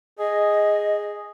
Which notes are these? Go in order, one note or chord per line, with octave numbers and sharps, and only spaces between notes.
G#4 D#5